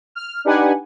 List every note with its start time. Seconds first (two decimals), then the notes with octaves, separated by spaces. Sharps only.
0.15 F6
0.45 D4 D#4 G4 B4 F#5 G#5